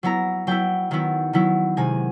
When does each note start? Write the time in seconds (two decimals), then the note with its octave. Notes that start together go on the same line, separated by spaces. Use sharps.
0.03 F#3 B3 E4 A#5
0.47 F#3 B3 E4 G5
0.91 D#3 F#3 B3 E4
1.33 D#3 F#3 B3 E4
1.77 C3 D#3 G#3 G#5